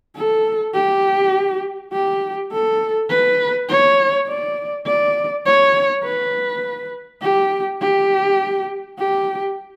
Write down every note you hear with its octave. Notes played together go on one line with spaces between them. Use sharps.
A4
G4
G4
A4
B4
C#5
D5
D5
C#5
B4
G4
G4
G4